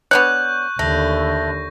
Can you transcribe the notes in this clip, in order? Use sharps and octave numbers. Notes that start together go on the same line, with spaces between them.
B3 D4 C#5 C#6 F#6 G6
D#2 D3 A3 A#6